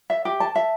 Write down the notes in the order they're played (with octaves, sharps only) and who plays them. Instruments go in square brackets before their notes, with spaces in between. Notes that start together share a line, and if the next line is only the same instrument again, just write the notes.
[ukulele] E5
G4
A5
E5